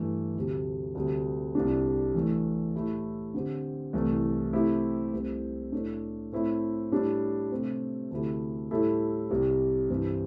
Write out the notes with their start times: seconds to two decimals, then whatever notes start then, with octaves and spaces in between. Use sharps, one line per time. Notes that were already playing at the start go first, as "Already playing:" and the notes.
Already playing: G2 E3 A3
0.35 D2 C3 G3
0.95 D2 C3 G3
1.55 C2 C3 G3 D4
2.15 E2 E3 A3
2.74 A2 A3 E4 G4
3.34 D3 C4 G4
3.93 C2 C3 E3 A3
4.53 C3 A3 C4 E4 G4
5.13 C2 C3 A3 C4
5.72 A2 A3 D4
6.32 A2 A3 C4 E4
6.92 A2 G3 D4
7.52 C3 A3 C4 G4
8.11 D2 C3 A3 E4 G4
8.71 A2 G3 E4 A4
9.30 C2 C3 G3
9.90 G2 E3 G3 C4